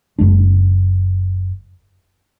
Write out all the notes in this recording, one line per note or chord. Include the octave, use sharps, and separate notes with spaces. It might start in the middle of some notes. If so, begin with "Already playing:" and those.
F#1 F#2 G#3 D4